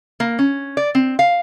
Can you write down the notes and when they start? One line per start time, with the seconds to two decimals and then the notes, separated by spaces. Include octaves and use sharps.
0.20 A#3
0.39 C#4
0.77 D5
0.95 C4
1.19 F5